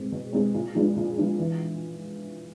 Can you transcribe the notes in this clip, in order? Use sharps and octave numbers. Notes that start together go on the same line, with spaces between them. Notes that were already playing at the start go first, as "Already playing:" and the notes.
Already playing: B2 G#3 C4
B2
G#3 C4
A#2
F3 G#3 B3 D4
A#2
F3 G#3 B3 D4
E3